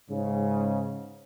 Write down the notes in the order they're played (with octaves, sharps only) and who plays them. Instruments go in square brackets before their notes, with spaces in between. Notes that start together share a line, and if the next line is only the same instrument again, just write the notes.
[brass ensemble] G#2 C#3